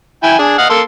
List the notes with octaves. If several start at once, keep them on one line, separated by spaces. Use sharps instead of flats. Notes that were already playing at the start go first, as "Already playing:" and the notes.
E4 G5 G#5
D4 G#4
D#5 F5 F#5
A#3 A4 C6